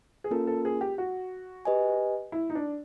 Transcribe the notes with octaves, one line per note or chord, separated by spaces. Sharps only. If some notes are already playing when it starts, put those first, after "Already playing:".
G#4
A#3 C#4 F4 A4 A#4
A4
G#4
G4
F#4
G4 B4 D#5 G#5
E4
D#4
D4